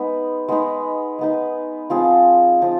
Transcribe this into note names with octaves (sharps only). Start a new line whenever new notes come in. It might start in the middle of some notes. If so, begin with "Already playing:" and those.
Already playing: G#3 B3 D#4 B4
G#3 B3 D#4 B4
G#3 B3 D#4 B4
F3 C4 F4 G#4
F3 C4 F4